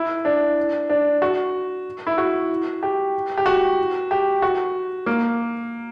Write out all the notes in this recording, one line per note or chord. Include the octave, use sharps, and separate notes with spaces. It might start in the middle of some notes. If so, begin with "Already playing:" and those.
Already playing: E4
D4
D4
F#4
E4
F#4
G4
G4
F#4
G4
F#4
A#3